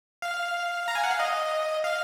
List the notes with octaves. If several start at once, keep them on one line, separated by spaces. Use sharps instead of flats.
F5
A#5
G#5
F#5
F5
D#5
F5